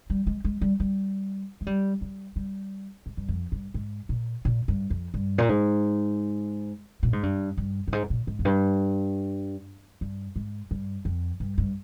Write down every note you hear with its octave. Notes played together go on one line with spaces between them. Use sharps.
G3
G#3
G#3
G3
G3
G#3
G3
G3
G3
G#2
G2
F2
G2
G#2
A#2
A#2
G2
F2
G2
A#2
G#2
A#2
G#2
G2
G2
G2
G#2
A#2
G#2
F2
G2
G2
G#2
G2
F2
G2
G2